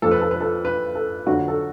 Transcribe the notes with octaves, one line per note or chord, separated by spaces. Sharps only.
F2 F3 A4
B4
A4
B4
A4
B4
A4
F2 D3 F#3 F#4
A4